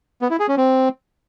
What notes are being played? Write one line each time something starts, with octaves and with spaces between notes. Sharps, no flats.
B3
E4
G#4
C#4
C4